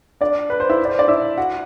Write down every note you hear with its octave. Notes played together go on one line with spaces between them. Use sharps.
D4 D5
B4
C5
E4 E5
D5
C5
D4 D5
E4 E5
F#4 F#5